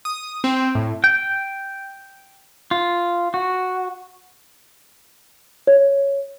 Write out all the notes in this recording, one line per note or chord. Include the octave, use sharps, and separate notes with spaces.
D#6
C4
A2
G5
F4
F#4
C#5